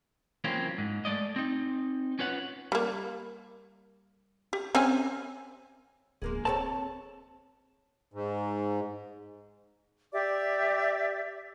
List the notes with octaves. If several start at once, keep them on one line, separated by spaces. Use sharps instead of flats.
E3 F#3 A#3 C4 C#4 F4
G#2
G#3 A3 D5 D#5
C4 D#4
C#4 F4 B4 C#5 F#5
G3 A#3
G4
C4 C#4 G#5
D1 G#3 A#3 G#4
C4 A4 A#4 C#5 A5
G#2
G4 D5 E5 D6